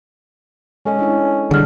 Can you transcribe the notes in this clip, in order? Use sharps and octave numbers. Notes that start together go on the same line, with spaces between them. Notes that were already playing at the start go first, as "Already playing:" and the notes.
G#3 C#4 A4 D#5
D4 E4 C#5
B2 D3 G3 G#4 A4 F6